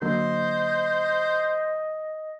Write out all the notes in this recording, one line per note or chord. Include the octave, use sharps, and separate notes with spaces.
D3 F#3 A#3 C5 D#5